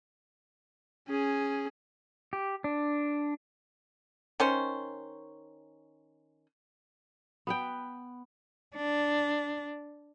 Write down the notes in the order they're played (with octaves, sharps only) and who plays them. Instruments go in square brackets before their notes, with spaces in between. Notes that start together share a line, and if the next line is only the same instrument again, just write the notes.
[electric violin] C#4 G#4
[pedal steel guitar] G4
D4
[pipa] D#3 C#4 C5
[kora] B3 B4 G5
[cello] D4